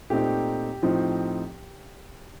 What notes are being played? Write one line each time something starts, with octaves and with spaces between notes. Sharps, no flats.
A#2 A3 C4 D#4 G4
A2 F3 C4 D#4